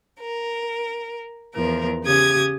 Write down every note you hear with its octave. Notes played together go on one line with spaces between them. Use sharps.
A#4
E2 F3 A#4
C#3 G4 D#6 G#6